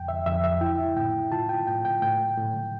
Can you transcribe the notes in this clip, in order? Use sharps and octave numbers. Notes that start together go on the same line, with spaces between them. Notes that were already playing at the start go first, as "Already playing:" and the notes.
Already playing: F2 G5
E5
F2 E5
E5
E4 G5
A2 G5
F4 A5
G5
A2 G5
G5
A2 G5
A2